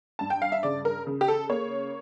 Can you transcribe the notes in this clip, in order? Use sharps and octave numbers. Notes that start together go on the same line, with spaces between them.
G2 A5
G5
F5
E5
C#3 D5
A#4
C#3
G4
A4
A#3 C#5